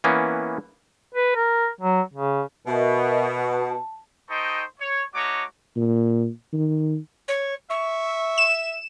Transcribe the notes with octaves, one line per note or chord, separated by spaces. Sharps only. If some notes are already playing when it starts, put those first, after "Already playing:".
E3 A#3 B3 C#4
B4
A#4
F#3
C#3
B2 A#4 D#5 E5
A5
D#4 A4 C5 D#5 G5 C#6
C#5
A3 D#4 F#4 C#5 F#5 D6
A#2
D#3
C#5
E5 C#6
E7